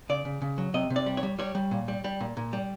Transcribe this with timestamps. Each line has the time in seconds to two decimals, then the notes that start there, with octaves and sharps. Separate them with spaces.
0.09 C#3 D5
0.25 C#3
0.42 C#3
0.58 F#3
0.74 C3 D#5
0.90 C3
0.96 D5
1.06 G3
1.17 C#5
1.23 G3
1.39 G3 C#5
1.55 G3
1.71 A#2
1.88 G3
2.04 G3
2.21 A#2
2.37 A#2
2.53 G3